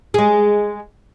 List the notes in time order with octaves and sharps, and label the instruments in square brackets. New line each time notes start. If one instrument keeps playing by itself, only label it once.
[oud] G#3 G#4